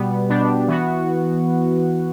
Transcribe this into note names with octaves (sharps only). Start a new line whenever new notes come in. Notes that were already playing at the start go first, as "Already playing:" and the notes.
Already playing: B2 G3 B3
B2 G3 B3 D4 G4
E3 B3 F#4